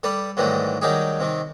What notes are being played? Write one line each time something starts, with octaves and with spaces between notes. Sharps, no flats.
G3 A4 B4 D5
G#2 D#3 E3 F#3 G3 A3
D#3 F#3 G3 D#4 G4 G#4
C3 D#3